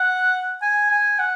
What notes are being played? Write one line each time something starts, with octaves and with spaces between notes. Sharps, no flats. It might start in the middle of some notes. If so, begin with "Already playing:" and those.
Already playing: F#5
G#5
G#5
F#5